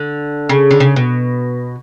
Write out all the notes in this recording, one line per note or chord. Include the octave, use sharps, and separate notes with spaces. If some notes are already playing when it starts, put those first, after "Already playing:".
Already playing: D3
C#3
D3
C#3
B2